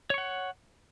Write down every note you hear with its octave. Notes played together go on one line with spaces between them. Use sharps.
C#5 F#5 C#6